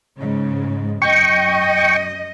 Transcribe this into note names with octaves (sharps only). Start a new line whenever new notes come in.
G#2 C#3
F#2 D#5 G5 C#6